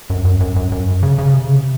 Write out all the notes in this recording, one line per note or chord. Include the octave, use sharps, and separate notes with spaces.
F#2
F#2
F#2
F#2
F#2
C#3
C#3
C3
C#3
C3